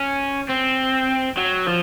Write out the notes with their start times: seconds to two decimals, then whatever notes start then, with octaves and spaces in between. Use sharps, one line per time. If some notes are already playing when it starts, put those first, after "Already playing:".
Already playing: C#4
0.49 C4
1.37 F#3
1.66 F3